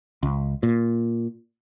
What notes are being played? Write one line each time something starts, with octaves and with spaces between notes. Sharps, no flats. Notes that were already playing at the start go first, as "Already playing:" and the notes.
C#2
A#2